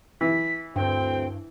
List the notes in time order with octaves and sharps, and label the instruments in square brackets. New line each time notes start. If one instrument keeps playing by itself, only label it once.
[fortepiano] E3 [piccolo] B6
[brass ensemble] D2 C4 [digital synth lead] G2 [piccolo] G5